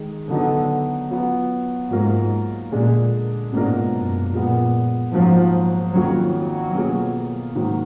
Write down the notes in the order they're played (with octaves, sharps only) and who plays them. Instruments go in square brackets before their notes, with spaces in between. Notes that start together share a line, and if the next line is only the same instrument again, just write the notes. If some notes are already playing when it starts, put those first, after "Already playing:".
Already playing: [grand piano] D#3 G#3
[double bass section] D3 [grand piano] F#3 B3 D#4
[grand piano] F#3 B3 F4
[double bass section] G#2 [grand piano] F#3 A#3 F4 A#4
[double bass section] A#2 [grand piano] D3 G#3 D4 G#4
[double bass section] G#2 [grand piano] B2 A#3 D4 F4 A#4
[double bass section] F#2
[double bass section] A#2 [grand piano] F3 G#3 B3
[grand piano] G#2 F#3 A#3 F4 [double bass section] F3
[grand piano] F2 D#3 A#3 F4 [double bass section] F#3
[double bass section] F#3
[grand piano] B2 A#3 F4 G#4
G#2 D#3 F#3 A#3